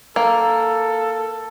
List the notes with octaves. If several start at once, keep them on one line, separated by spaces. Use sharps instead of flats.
A#3 A4